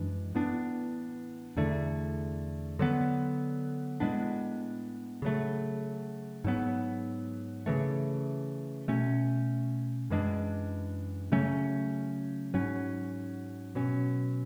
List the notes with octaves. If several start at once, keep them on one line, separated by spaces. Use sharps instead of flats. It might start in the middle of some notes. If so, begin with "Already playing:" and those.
Already playing: F#2 E3 G#3 D4
A2 E3 B3 D4
E2 D3 A3
D3 F#3 B3
A2 G#3 B3 D4
C#3 F#3 A3
G#2 F#3 B3
C#3 E3 A3
B2 A3 C#4
F#2 E3 G#3 D4
C#3 F#3 A3 C#4
G#2 F#3 C#4
B2 F#3 C#4